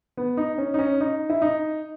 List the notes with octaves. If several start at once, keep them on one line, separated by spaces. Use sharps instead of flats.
B3
D#4
C#4
D#4
C#4
D#4
E4
D#4